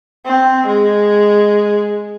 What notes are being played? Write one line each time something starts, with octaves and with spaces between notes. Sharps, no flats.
C4
G#3